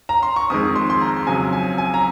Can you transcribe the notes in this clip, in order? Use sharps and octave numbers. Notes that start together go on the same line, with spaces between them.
A#5
C6
C#6
F2 D#3 G#3 D#6
C6
C6
A#5
F2 C#3 F#3 G#5
G#5
G#5
A#5